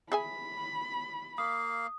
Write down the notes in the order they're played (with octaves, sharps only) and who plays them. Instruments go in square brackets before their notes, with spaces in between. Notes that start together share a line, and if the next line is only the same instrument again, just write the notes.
[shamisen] G#4 E5 G#5 [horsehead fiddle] B5
[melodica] A#3 F5 [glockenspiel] D#6